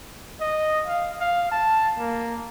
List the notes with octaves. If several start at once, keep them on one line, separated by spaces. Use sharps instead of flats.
D#5
F5
F5
A5
A#3